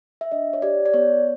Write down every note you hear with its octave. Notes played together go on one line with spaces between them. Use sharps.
E5
D4 D#5
C#5
G4 D5
D5
B3 C#5